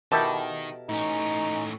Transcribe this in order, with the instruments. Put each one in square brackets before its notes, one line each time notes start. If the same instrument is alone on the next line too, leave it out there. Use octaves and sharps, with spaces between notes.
[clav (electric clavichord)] B2 G4 A4 [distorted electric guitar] D#3 [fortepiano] E4 A#4 A5
[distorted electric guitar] A2 C#4 [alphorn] D#4